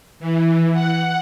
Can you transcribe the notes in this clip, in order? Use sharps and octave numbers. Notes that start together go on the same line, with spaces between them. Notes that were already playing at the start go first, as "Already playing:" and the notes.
E3
F#5